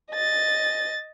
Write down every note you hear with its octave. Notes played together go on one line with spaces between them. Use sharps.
D#5 A6